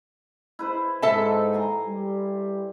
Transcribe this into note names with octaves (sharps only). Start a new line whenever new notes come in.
E4 B4 C5
G#2 A4 E5 A5
G#5 A#5 C6
G3